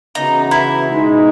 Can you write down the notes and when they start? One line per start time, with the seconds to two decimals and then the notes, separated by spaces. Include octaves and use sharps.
0.15 C#3 E3 B3 D#4 F#4
0.51 E4
0.89 B2 G#3 D#4